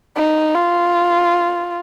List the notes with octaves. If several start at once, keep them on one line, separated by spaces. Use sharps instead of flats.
D#4
F4